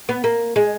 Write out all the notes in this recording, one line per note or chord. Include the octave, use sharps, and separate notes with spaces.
B3
A#3
G#3